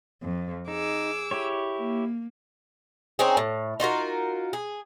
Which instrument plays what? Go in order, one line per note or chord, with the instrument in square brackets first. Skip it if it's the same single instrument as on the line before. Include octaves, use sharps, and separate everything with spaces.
[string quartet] F2
[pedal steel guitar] D#4 [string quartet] G#4 D6 E6
[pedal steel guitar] E4 G4 C#5
[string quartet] A#3
[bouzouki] C4 C#4 D#4 G#4
A2
D#4 F4 F#4 A#4
G#4